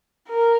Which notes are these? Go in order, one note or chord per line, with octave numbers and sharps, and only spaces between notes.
A#4